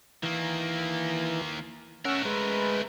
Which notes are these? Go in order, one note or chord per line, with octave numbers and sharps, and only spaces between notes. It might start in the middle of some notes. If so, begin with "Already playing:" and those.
D#3 E3 A#3
A3 C#4 A#4 F#5 E6
G#3 B4